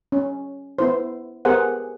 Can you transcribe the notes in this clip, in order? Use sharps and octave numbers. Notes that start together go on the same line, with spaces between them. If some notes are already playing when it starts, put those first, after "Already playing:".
C#4
B3 E4 C5
B3 G4 G#4 A#4 C5 F#5